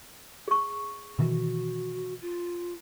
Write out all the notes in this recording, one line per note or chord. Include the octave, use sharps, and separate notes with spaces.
G#4 C#6
B2 D#3 E3 F#4
F4